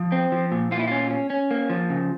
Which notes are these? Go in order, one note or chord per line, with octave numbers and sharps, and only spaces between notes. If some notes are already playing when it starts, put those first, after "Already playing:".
Already playing: F3
C4
F3
A#2
A#2 F4
E4
C#4 F4
C#4
C#4
A#3
F3
C#3